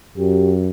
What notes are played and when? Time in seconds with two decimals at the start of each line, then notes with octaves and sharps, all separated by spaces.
0.17 F#2 G4